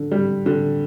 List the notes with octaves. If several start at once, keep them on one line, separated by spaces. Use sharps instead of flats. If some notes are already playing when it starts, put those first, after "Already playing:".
Already playing: D3
G3
D3